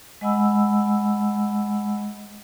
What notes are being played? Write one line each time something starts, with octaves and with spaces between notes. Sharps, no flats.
G#3 D#5 F#5 G#5 B5 E6